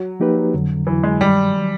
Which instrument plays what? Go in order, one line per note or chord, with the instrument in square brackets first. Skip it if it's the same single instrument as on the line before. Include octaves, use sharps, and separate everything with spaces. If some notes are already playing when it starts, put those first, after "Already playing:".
Already playing: [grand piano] F#3
[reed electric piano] F3 A#3 D#4 G4 B4
F2 D3 F#3
[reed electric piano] F2 D3 F#3 [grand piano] E3
[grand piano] G#3
[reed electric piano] G2 D#3 F#3 [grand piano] G3
[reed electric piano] D#3 F#3